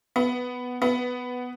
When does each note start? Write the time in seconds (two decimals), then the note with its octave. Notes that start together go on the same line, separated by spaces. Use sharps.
0.16 B3
0.82 B3